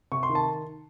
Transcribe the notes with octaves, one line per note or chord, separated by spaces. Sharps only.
C3 C#6
C6
D#3
A5